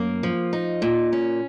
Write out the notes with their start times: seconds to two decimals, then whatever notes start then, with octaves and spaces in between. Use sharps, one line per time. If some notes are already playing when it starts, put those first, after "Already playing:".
Already playing: F#2 A#3
0.23 F3
0.53 D#4
0.82 A#2
1.12 C#4